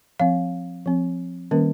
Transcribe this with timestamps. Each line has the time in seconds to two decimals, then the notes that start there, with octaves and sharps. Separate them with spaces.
0.20 F3 C4 F5
0.86 F3 C4
1.51 D#3 G3 A#3 C#4 A#4